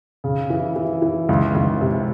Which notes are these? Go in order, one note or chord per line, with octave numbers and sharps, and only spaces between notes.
C#3
E3
E3
E3
C#2
C#2
C3